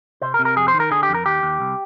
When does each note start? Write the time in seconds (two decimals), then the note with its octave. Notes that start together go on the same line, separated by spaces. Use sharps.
0.22 C3 C5
0.34 A#4
0.39 C3
0.45 A#4
0.56 F2 G#4
0.68 C5
0.74 D#3
0.80 A#4
0.91 D3 G#4
1.03 G4
1.09 F2
1.15 A#4
1.26 D#2 G4
1.43 D#2
1.60 C2